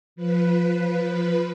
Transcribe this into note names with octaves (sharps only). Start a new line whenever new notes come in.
F3 B4